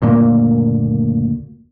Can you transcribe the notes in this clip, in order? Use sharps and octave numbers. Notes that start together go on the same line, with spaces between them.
F#1 D2 A#2 A#3